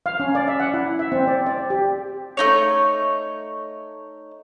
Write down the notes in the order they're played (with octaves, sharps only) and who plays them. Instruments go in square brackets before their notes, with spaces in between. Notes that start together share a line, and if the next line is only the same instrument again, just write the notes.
[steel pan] F5
C#4
D5
E5
F#5
E4
E5
C4
D5
D5
G4
[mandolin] A3 D#4 C#5